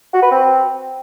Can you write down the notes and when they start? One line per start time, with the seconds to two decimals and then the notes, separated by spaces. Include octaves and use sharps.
0.14 F#4
0.23 B4
0.32 C4